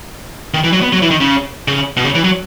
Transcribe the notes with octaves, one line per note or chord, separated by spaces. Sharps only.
D#3
E3
F#3
B3
F#3
E3
D#3
C#3
C#3
B2
C#3
E3
F#3